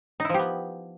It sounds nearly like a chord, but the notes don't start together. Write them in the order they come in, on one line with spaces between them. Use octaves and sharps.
D#4 E4 F3 G4 B3